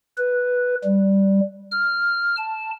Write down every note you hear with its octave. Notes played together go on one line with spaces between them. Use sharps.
B4
G3
F6
A5